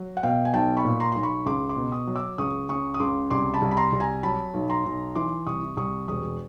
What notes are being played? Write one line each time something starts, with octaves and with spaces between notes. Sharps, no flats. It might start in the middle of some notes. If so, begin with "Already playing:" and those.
Already playing: F#3
F#5
B2 F5 G5
G#5
B1 G5 A5
B5 C#6
A#2
A#5 C6
B1 C6
B5 C#6
C#2 C6 D6
C6 D6
B2
C#6 D#6
F#3
D6 E6
C#2 C#6 D#6
C#3 C#6 D#6
D#6
C#2 C6 D6
C2 C6 D6
A5 B5
C2
B5
A#5 C6
C2
G#5 A#5
F#3 A5 B5
B1
A#5 C6
B1
E3 C6 D6
C2 C#6 D#6
C2 C#6 D#6
E1 C#6 D#6